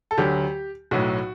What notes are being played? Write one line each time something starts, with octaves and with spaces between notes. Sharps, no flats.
A4
D2 D3 F#3 G4
B1 A2 F#3 F#4